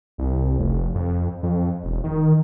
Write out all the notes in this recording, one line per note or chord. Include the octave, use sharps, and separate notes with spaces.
C2
F1
F2
F2
E1
D#3